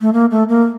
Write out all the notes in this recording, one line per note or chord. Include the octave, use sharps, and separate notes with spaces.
A3
A#3
A3
A#3